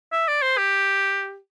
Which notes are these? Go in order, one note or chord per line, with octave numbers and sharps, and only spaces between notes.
E5
D5
C5
G4